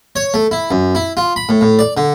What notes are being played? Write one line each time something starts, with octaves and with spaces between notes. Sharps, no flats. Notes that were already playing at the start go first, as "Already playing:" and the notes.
C#5
A3
E4
F#2
E4
F4
B5
A2
A2
D5
D3